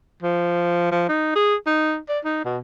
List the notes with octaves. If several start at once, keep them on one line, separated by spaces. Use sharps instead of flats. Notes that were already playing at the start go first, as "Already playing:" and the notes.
F3
F3
D#4
G#4
D#4
D5
D#4
B2